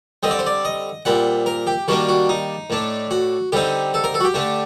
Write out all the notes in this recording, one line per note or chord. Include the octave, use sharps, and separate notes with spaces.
D3 G3 C4 D#5
D5
C5
D5
D#5
A#2 G3 C4 F#5
A#4
G4
D#3 G3 A#3 D4 F#4
F#4
D#4
A2 A3 D4
F#4
D3 G3 C4 D#4 G4
A4
A#4
A4
F#4
G4
D3 A3 D4